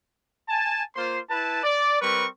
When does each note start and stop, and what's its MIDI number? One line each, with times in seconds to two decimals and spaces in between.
0.49 0.82 80
0.49 0.82 81
0.96 1.20 58
0.96 1.20 65
0.96 1.20 72
0.96 1.20 84
1.30 1.61 64
1.30 1.61 71
1.30 1.61 81
1.64 2.00 74
2.02 2.27 55
2.02 2.27 60
2.02 2.27 70
2.02 2.27 71
2.02 2.27 85